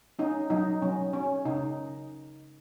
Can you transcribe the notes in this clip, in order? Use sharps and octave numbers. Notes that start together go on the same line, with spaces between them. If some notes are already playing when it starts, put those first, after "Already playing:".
C#4 D#4
F#3 D#4
F#3 C#4
C#4
C#3 D#4